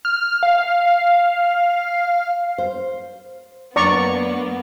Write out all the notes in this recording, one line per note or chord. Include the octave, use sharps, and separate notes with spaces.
F6
F5
C5
F#2 A#3 B3 D4 D5 A#5 C#6